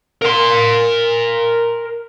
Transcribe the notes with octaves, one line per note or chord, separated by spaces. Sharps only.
A#4 C6